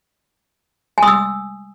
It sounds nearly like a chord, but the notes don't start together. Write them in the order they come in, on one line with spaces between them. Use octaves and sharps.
G#5 D#6 E6